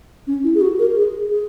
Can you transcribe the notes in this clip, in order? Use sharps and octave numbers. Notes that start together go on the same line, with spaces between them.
C#4
E4
G#4
F#4
A#4
G#4
G#4